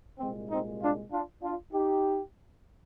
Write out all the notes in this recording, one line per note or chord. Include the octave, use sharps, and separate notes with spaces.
C2 A#2 G#3 C4
C4 D#4
D4 F4
D4 F4
D4 F4
D#4 G4